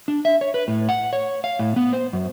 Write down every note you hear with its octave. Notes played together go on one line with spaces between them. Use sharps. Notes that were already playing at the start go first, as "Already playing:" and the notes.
D4
E5
C#5
B4
A2
F#5
C#5
F5
A2
B3
C5
F#2